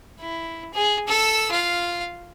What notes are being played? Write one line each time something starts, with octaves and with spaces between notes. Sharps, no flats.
E4
G#4
A4 E6
F4 F5